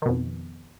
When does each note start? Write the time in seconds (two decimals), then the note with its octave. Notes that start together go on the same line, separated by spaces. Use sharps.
0.02 D#3
0.06 B2
0.09 F2